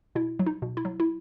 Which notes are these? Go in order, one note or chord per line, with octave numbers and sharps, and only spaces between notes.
B2 E4
F#3
D#4
B2
E4
F#3
E4